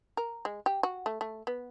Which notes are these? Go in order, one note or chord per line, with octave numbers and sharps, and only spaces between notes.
A#4
G#3
G4
F#4
A3
A3
B3